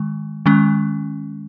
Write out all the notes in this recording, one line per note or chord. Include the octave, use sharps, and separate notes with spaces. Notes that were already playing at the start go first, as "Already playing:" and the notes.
Already playing: D#3 G#3
D#3 G#3 C#4